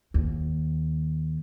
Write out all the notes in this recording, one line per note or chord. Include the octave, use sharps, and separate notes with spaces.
D#2